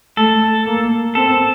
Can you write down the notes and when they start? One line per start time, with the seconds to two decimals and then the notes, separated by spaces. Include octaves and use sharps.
0.17 A3 A4
0.66 A#3
1.15 C4 A4